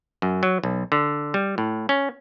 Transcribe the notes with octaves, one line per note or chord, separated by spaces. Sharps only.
F#2
F#3
B1
D3
G3
A2
C#4